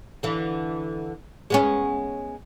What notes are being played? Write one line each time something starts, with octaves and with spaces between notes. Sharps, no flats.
D3 E3
G#3 B3 C#4